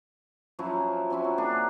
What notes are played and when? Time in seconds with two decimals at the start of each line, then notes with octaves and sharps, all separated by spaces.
0.59 F3 F#3 C#4 E4
1.10 F#3 C4 C#4 E4
1.24 F#4
1.38 A#3 D4 G#4